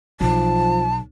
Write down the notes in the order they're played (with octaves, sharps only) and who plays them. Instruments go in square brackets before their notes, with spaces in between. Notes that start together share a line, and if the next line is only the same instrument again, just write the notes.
[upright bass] B1 [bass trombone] F3 [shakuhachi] A5